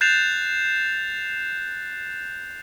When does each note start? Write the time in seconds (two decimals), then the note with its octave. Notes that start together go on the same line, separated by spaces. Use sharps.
0.01 F#6 G6 A6 C7 E7 F7